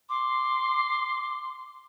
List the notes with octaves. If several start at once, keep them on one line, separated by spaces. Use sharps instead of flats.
C6 D6